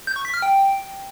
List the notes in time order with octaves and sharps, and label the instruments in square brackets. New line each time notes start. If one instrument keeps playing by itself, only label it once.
[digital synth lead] G6
C#6
B6
F6
G5